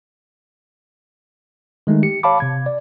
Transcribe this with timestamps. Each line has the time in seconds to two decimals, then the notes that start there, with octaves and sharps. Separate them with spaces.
1.87 D#3 G#3 A3 D#4
2.03 G4 C#7
2.23 C#5 F5 A5 B5 D6
2.40 C3 G#6
2.66 D5